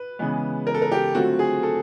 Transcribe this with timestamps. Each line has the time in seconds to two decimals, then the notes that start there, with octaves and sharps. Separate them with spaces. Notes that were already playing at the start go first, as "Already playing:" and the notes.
Already playing: B4
0.19 C#3 E3 G#3 B3
0.67 A#4
0.74 A4
0.82 A#4
0.92 G4
1.15 D3 F#3 A3 C4 F4 F#4
1.39 G#4
1.63 A4